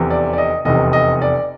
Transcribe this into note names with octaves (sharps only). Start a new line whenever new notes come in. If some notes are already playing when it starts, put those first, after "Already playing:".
Already playing: F1 E2 C3
D5
D5
D#5
F1 E2 C3 D#5
D#5
D5